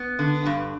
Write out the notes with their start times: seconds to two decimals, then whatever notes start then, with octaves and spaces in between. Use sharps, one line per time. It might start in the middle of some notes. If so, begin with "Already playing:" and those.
Already playing: B3
0.19 D3
0.46 G2